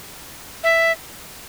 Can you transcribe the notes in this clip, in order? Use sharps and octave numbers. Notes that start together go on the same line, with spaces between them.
E5